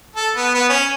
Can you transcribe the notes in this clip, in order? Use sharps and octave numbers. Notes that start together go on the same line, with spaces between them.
A4
B3
B3
C#4